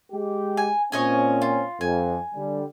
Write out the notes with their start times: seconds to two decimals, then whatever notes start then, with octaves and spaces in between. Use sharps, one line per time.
0.12 G#3 G4
0.57 G#5
0.92 A#2 C4 C#4 C#5 D#5 G#5
1.42 F4
1.81 F2 G#5
2.35 D3 G3